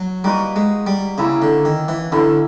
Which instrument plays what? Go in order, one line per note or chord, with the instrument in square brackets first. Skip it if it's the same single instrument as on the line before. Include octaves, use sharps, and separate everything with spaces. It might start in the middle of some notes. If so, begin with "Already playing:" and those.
Already playing: [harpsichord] F#3 [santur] F#4
[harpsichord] G3 [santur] A#3 D#4 F#4 B4
[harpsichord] G#3
G3
[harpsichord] C#3 [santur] A#3 C#4 E4
[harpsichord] D3
D#3
E3
[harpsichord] D3 [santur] A#3 C#4 E4